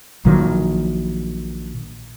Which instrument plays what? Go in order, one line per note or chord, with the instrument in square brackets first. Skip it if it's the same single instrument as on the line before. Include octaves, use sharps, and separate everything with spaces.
[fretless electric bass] A#1 A#2 D#3 F#3